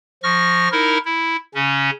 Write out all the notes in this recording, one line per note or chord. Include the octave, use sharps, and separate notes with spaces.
F3 C#6 F6 A#6
D#4 E4 A#4
E4
C#3 C#4